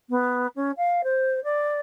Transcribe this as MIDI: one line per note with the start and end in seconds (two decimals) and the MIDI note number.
0.09 0.47 59
0.55 0.71 61
0.77 1.01 77
1.03 1.42 72
1.43 1.80 74